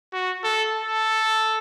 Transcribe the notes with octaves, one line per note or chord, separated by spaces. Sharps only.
F#4
A4
A4